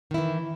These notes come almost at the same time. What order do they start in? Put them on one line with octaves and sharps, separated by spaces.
D#3 E4 E3